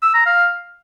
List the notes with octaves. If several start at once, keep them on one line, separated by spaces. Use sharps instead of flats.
E6
A#5
F5